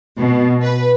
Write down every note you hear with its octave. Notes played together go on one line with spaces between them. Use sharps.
B2
B4